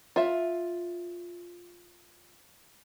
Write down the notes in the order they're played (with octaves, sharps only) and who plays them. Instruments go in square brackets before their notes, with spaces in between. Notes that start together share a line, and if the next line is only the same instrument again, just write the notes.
[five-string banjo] F4 E5